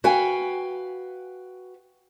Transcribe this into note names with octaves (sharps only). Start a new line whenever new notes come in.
F#4 B4 F5 G5 G#5